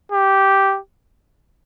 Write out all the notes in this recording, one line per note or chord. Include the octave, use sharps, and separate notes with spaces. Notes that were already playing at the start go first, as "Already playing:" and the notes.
G4